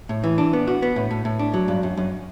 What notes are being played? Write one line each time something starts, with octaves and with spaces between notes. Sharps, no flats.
A2
E3
D4
B3
F#4
B3
A2
A2
A2
D4
F#3
G2
F#2
F#2